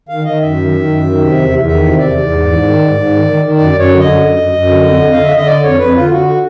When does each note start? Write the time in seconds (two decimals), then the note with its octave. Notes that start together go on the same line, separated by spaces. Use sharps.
0.09 D#3 F5
0.24 D#3 D#5
0.41 F#2 E5
0.57 D#3
0.72 D#3
0.88 F#2
1.04 D#3
1.20 C3
1.36 E2
1.51 E2
1.67 D#3 E5
1.83 C3
1.99 E2 D5
2.15 E2
2.31 G#2
2.46 G#2
2.63 D#3
2.78 G#2
2.93 G#2
3.10 D#3
3.25 D#3
3.41 D#3
3.57 F#2 D5
3.73 F#2
3.79 C#5
3.88 D3
3.99 D#5
4.05 F#2
4.20 F#2
4.36 F#2
4.52 F#2
4.68 D3
4.83 F2
5.00 F2
5.12 D3 F5
5.23 E5
5.31 D3 D#5
5.47 D3 D5
5.62 F2 C#5
5.79 F2 B4
5.95 D3 F4
6.10 D3 F#4